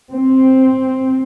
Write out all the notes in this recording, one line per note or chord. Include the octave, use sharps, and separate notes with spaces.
C4